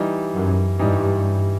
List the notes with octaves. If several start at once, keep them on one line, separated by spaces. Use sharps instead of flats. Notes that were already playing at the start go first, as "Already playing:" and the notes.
Already playing: E3 G3 D#4
F#2
G2 E3 G3 D#4